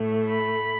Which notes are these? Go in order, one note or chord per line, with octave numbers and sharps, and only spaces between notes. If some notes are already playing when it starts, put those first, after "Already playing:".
Already playing: A2 A3
B5